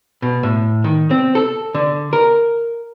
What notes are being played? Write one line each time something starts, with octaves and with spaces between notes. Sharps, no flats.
B2
A2
D#3
C4
A4
D3
A#4